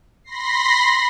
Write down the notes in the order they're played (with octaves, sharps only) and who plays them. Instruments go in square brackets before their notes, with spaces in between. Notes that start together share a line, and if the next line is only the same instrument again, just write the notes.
[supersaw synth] B5 C6 A#6 C7